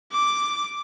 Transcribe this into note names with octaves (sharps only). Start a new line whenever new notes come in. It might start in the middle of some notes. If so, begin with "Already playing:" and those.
D6